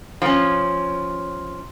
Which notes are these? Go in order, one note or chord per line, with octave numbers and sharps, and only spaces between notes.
F3 C#4